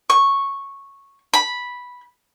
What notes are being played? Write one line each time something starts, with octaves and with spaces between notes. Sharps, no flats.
C#6
B5